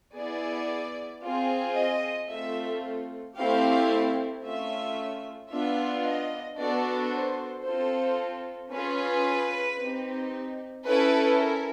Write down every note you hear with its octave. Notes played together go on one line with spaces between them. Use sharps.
B3 E4 G#4 D5
C4 F4 G#4
D#5
A3 C4 F4 A4 E5
A3 C4 E4 G4 F5
A3 C#4 F4 E5
B3 D4 F4 E5
D#5
B3 D4 F#4 A4 D5
C5
C4 F4 A4 C5
C#4 F4 G#4 B4
C4 D#4 G4
C#4 E4 A4 B4
A#4